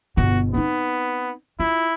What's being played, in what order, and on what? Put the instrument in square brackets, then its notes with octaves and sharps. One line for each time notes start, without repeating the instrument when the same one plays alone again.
[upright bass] G1 B2 [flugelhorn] F#4
[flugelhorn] B3 [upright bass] C4 D#4
[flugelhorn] E4 [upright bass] F4